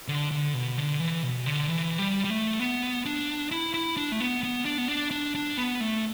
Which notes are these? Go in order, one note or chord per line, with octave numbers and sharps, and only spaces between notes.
D3
D3
B2
D3
E3
B2
D3
E3
G3
G3
A3
B3
D4
E4
E4
D4
A3
B3
B3
D4
B3
D4
D4
D4
B3
A3